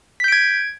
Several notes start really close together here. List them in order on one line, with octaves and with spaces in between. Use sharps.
B6 G6 D7 G#6